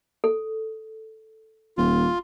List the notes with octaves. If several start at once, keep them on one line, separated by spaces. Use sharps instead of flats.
A4
D#1 F4